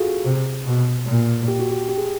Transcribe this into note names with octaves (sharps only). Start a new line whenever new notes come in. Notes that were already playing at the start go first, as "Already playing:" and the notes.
Already playing: F4 F#4 G#4 A4
C3
B2
A#2
G4
F#4
G4
G4
G#4